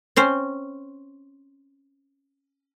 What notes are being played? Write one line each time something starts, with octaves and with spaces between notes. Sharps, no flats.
C4 C#4 C5